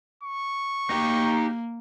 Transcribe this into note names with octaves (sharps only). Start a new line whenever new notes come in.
C#6
A#3 D#4 G4